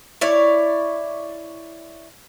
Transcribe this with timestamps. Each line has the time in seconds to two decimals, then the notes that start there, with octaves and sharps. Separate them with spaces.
0.21 E4 C#5 D5